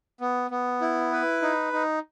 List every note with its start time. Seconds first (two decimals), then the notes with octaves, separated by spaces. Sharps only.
0.20 B3
0.51 B3
0.81 E4
1.12 B4
1.42 D#4
1.73 D#4